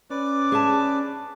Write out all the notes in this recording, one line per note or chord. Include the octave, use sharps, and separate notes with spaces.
C#4 B4 D5 D6
G#4 E5 A5